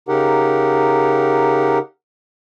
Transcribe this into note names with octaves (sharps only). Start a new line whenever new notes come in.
C#3 D#4 G4 A#4 F#5